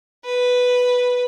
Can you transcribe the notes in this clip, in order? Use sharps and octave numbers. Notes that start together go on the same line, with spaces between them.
B4